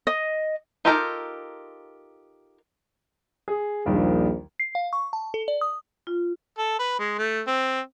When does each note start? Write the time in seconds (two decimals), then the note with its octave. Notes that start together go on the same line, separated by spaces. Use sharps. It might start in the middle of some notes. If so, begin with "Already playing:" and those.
0.07 D#5
0.85 D#4 F4 G4 A4 A#4
3.48 G#4
3.86 A#1 D#2 D#3 G3
4.60 C7
4.75 F5
4.93 C#6
5.13 A5
5.34 A4
5.48 D5
5.61 D#6
6.07 F4
6.58 A4
6.79 B4
6.99 G#3
7.18 A3
7.47 C4